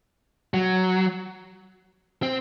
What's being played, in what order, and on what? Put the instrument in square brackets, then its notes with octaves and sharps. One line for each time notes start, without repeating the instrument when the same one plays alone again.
[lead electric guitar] F#3
C4